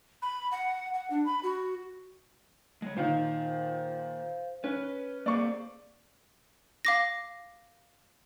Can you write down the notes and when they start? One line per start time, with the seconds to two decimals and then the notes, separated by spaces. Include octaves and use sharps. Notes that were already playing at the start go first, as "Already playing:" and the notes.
0.22 B5
0.52 F#5
0.94 F#5
1.10 D4
1.26 B5
1.43 F#4
2.82 G#3 C#5
2.97 A#2 D#3 C5 F5
4.64 C#4 B4
5.26 A#3 C4 G#4 D5 C#6
6.85 F5 D6 A#6